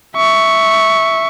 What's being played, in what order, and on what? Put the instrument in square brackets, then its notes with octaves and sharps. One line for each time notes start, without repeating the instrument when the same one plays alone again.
[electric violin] E5 C#6